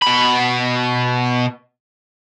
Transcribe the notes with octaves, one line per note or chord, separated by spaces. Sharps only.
B2 B5